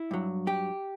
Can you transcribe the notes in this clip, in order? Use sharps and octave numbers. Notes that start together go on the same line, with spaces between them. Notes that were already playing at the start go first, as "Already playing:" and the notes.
Already playing: E4
G2 F#3
G4